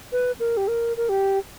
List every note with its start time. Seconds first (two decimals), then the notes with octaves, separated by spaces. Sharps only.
0.12 B4
0.40 A#4
0.57 G4
0.68 A#4
0.97 A#4
1.09 G4